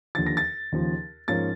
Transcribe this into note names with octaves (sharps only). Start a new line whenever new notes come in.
D#2 D3 F3 A6
A#6
A6
D#2 C#3 F3
G#2 F3 A#3 C#4 A6